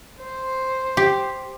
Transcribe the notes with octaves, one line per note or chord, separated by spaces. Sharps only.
C5
G4